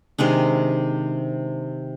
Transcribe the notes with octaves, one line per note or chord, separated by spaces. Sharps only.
C3 D#3 G#3 D4